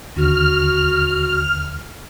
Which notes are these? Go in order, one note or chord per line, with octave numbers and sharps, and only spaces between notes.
D#2 D3 F#4 F6